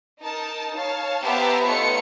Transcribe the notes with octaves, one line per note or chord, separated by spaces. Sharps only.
D#4 A#4 A5
C#5 F5 A5
B3 G4 C5 E5 A5 A#5
A3 B3 D#4 F4 C#5 C#7